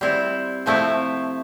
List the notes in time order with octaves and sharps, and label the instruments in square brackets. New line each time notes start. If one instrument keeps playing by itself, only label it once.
[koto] G3 C4 E4
C3 F3 A3 C4 E4